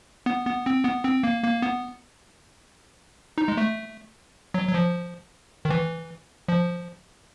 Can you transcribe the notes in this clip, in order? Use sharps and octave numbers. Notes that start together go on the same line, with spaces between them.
B3
B3
C4
B3
C4
A#3
A#3
B3
D#4
G#3
A3
F#3
F#3
F3
D#3
E3
F3